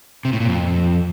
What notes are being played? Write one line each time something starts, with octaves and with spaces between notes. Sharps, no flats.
C3
A2
A#2
F2